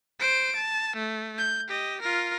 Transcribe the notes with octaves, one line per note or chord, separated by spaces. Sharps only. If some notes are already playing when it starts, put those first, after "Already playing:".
C5 D7
A5
A3
G6
G4 D#5
F4 A#4